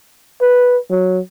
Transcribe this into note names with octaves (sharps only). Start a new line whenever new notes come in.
B4
F#3